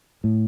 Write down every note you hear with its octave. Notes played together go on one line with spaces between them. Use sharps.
A2